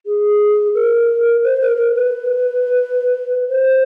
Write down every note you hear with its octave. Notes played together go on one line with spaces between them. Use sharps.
G#4
A#4
C5
A#4
A#4
B4
C5